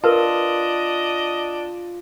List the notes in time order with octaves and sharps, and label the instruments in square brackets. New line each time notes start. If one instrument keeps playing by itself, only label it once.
[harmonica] D4 D#5 [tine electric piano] F4 [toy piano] A#4 B4 A5